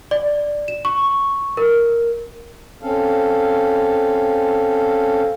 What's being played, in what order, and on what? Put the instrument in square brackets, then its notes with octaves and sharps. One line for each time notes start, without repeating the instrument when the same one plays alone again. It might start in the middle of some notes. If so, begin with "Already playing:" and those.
[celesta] D5
E7
C#6
A#4
[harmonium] C4 C#4 A4 F5